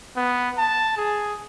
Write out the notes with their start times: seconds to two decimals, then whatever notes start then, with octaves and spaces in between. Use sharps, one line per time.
0.16 B3
0.58 A5
0.97 G#4